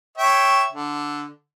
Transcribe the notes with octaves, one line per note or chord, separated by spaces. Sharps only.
C#5 E5 G5
D3